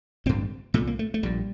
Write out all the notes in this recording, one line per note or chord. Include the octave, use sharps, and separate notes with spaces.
A1 G2 D3 C4
C2 A#2 A3
A#3
A3
A3
A#1 A#2 G3